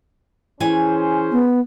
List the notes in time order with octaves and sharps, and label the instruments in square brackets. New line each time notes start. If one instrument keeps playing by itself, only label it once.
[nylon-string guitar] E3 B4 G#5 [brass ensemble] C#4 G#4 C5
[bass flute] B3